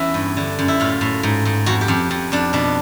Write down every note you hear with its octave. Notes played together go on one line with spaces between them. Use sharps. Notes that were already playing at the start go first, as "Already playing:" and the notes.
Already playing: E2 E3 C#4 E4
G2
D3
F#2
E4
A2 F4
A2
G#2
G#2
F2 F#4
G4
F2
F2
F2 D4
B2 D4